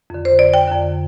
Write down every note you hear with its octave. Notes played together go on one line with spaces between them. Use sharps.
F2 D3
C5
D5
G5
F2 D3